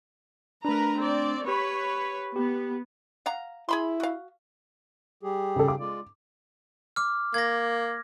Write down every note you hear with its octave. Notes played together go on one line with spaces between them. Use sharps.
A3 D4 A#4 B4 A#5
C4 D5
G4 B4 C#5
B3 G4
F5 F#5 A#5
E4 G#4 B5 C6
F#4 F5
G3 G4 G#4
C#3 A4
D6
G#3 F4 D5
D6 F6
A#3 G#6 A#6